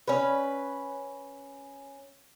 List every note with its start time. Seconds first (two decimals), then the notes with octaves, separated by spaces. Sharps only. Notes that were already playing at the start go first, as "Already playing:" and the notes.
0.08 C#4 B4